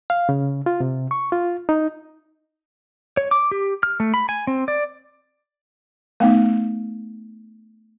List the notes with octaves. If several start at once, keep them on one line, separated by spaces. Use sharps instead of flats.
F5
C#3
F4
C3
C#6
F4
D#4
C#5
D6
G4
F6
A3
B5
G#5
C4
D5
A3 B3 D#4